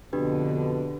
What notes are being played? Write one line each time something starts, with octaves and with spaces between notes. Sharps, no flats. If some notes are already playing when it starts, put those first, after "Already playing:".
F2 B2 D3 D4 G4 B4